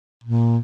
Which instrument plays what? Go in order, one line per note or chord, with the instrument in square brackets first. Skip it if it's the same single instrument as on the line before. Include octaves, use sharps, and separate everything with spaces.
[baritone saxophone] A#2